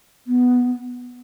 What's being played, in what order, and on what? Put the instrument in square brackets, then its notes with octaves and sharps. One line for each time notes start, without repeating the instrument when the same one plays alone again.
[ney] B3